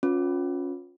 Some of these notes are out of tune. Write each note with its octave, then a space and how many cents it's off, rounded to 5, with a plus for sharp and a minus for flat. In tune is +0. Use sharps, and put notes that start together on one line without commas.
C#4 +0 F4 +30 B4 +0